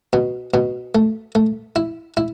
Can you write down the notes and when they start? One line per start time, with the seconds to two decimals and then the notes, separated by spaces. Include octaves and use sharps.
0.13 B2
0.54 B2
0.95 A3
1.35 A3
1.76 E4
2.17 E4